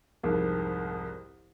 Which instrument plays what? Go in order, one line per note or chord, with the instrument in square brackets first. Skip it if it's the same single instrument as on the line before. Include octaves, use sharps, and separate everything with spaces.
[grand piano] C2 F2 G#2 [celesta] G#4 A#4